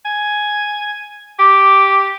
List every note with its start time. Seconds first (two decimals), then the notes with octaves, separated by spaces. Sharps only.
0.05 G#5
1.39 G4 D6